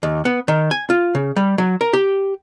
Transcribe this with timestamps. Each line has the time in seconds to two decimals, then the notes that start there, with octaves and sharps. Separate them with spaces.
0.03 D#2
0.25 B3
0.48 D#3
0.71 G#5
0.90 F4
1.15 C#3
1.36 G3
1.58 F#3
1.81 A#4
1.93 G4